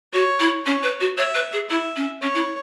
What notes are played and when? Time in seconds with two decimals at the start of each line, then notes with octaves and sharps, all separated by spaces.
0.13 F#4 C#5
0.39 E4
0.65 C#4 C#5
0.82 B4
1.00 F#4
1.17 C#5 E5
1.34 B4
1.52 G#4
1.69 E4 E5
1.96 C#4
2.22 C#4 C#5
2.34 E4